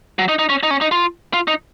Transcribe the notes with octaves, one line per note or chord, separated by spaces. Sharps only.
F#3
D#4
D#4
C#4
D#4
C#4
D#4
F4
F4
D#4